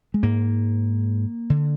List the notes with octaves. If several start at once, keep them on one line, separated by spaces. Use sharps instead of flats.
G#3
G#2 A#3
D3